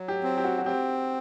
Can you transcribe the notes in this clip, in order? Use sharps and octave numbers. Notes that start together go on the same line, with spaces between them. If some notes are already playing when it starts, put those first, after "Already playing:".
Already playing: F#3
G4
C4
G4
F#4
F#4
C4 G4